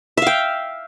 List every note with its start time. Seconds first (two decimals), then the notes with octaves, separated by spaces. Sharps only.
0.17 E5
0.22 F5
0.27 G5